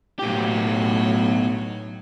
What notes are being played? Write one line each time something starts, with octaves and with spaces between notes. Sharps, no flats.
B1 A2 F#3 G4